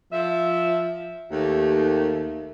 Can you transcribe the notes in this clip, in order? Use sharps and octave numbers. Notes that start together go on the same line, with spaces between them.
F3 E5
D#2 A3